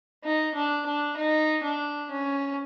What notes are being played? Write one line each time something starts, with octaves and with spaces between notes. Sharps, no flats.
D#4
D4
D4
D#4
D4
C#4